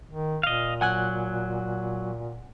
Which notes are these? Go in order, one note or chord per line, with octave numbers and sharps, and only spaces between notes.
D#3
A#2 D#5 F5
F#3 F#5 G#5 F#6